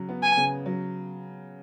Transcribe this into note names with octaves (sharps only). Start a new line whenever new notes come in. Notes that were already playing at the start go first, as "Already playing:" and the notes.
Already playing: C#3 F#3
B3
G#5
C#3
F#3